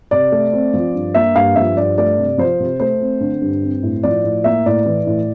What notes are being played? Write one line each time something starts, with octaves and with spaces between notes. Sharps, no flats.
C3 D5
A3
C4
F3
G2
A#3 E5
G2 F5
F3 E5
G2 D5
A3 D5
C3
F3 C5
C3
A3 C5
C4
D3
G2
C4
A2
F3 D5
A2
A#3 E5
A2 D5
E3
A2